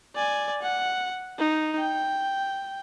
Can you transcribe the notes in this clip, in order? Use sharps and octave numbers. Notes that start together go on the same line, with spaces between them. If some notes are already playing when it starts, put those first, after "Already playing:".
D5 G#5
F#5
D#4
G5